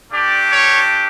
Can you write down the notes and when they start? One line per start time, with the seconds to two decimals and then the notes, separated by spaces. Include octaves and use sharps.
0.11 A3 D4 G4 D5
0.51 C#5